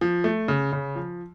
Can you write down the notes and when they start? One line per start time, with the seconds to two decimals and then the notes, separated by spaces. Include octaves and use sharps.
0.01 F3
0.24 A3
0.48 C#3
0.73 C#3
0.96 F3